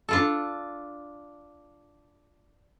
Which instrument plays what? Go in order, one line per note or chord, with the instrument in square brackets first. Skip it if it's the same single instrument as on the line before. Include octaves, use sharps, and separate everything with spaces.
[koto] D4 F4 A4